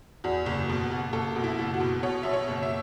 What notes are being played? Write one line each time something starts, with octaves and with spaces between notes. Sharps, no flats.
E2 F#4
F#1
B2
F#1
F#1 A4
B2
E4
F#1
F#4
B2
B2 C#5
B2 E5
C#5
F#1
E5